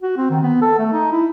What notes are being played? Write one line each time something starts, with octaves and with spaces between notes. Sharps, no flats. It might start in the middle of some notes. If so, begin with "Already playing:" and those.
F#4
C4
D#3
B3
A4
A3
D#4
E4